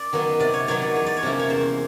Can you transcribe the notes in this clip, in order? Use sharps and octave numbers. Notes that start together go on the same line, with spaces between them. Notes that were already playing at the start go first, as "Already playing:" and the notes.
Already playing: D5
D#3 F#3 B3
C3 D5
C#5
D#3 F#3 B3 C#5
D5
E2 C#5
D5
C#5
C3 F3 A#3 C#4
C#5
E2 C5